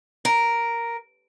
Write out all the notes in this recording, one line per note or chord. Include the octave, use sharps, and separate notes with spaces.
A#4